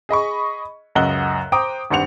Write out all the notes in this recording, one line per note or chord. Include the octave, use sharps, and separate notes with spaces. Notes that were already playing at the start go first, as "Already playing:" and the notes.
G#4 D#5 B5 C#6
C#2 F#2 D#5 F#5 F#6 G7
C5 G5 A#5 D6 D#6
G#1 G2 C5 F#5 C#7 F7